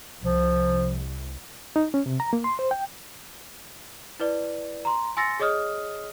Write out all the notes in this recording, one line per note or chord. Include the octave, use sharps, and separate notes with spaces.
C2 F3
D#4
C#4
C3
A#5
A#3
C6
C5
G5
E4 B4 D5
A#5 C6
G#5 C6 E6 A6 A#6 C#7
G#4 C#5 D#5 D#6 F6